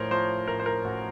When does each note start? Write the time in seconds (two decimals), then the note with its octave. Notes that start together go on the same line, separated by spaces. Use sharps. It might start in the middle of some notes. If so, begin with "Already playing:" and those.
Already playing: A1 A2 F3 A#4 C5 C#5
0.11 F3 C5
0.47 A1 A#4
0.60 C5
0.66 A#4
0.84 A1 F#4